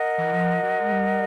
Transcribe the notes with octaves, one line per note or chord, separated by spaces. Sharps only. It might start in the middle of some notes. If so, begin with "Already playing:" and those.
Already playing: A#4 D#5 F#5
E3
F3
F#3
G#3
G3